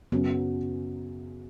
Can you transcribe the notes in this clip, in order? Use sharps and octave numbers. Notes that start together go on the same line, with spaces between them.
F#2 C#3 F#3 B3 C#4